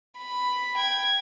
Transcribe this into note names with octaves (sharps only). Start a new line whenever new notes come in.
B5
G5 G#6